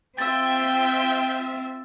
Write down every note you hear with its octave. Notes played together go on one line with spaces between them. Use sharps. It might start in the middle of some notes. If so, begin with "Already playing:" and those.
C4 F4 E5 G5 E6 A6